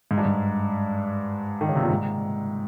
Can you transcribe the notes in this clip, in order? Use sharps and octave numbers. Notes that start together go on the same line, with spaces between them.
G#2
G2
G#2
D#3
C#3
C3
A#2
G#2